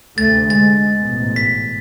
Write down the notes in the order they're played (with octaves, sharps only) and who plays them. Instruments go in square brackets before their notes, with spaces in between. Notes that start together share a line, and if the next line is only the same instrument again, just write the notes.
[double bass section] D2 C3 A3 [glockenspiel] A6
[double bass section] G#3 [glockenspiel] A6
[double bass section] A1 G#2 B2
[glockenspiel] B6